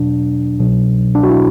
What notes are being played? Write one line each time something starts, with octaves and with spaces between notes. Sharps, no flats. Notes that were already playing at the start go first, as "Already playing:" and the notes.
Already playing: E2 B2 F#3 D4
C2 B2 F#3
D4
F#4
E4